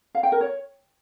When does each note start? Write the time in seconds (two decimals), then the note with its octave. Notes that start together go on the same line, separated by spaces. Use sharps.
0.15 F5
0.23 G5
0.32 A#4
0.41 C#5